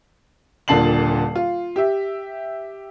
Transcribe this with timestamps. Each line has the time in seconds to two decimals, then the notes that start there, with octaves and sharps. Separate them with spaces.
0.68 D#1 A#2 D3 A5 C7 F#7
1.35 F4
1.76 G4 E5